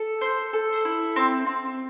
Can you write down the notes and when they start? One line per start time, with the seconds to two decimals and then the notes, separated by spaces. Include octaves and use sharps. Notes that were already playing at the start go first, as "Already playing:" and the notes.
Already playing: A4
0.21 C5
0.53 A4
0.85 E4
1.16 C4
1.47 C4